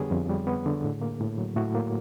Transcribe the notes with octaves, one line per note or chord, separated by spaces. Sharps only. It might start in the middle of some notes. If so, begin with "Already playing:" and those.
Already playing: F2 D3 G3 B3 G4 G#4 C#5
F2
G3
B3
D3
A2
A#3
A2
F#3
A2 F#4
A#3